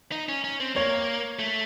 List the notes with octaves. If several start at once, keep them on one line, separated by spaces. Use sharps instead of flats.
D#4
C#4
C#4
C4
A#3 C#5
A3